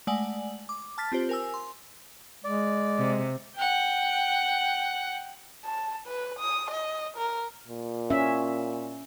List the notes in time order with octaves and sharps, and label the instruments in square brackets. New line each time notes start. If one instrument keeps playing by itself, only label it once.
[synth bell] G#3 A3 D5 F#5 G#5 F#7
D6
A5 F6 A6 B6
C4 F4 G4 C5
A#4 G#5 E6
C6
[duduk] G#3 [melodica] D5
[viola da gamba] C3
[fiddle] F#5 G5
[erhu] A5
B4
D#6
D#5
A#4
[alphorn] A#2
[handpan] C#4 E5